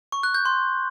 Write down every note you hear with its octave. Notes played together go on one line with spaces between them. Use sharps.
C#6
F#6
G6
C6